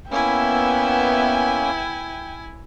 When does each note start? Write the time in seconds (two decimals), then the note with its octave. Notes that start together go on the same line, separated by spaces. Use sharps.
0.11 A#3 B3 C#4 E4 E5 G5 G#5